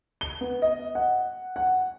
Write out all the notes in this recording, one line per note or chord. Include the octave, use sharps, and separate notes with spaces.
G7
B3
D#5
F#5
F#5